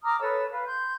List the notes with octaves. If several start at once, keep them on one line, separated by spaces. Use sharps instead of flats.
A#5 D6 D#6 F6
A4 B4 C#5 E6
B4 F5
C6 G6